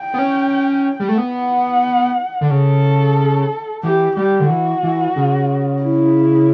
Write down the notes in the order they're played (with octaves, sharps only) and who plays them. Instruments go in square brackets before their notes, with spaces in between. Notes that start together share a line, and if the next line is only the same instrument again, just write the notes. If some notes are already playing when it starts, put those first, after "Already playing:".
Already playing: [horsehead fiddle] G5
[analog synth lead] B3
C#4
G3
A3
[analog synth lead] B3 [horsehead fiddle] F#5
[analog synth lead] D3
[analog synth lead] C#3 [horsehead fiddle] A4
[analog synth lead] E3 [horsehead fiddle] G4
[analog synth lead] G3 [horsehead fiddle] G4
[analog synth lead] D3
[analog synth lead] E3 [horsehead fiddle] F#4
[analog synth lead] E3
C#3
[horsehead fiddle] E4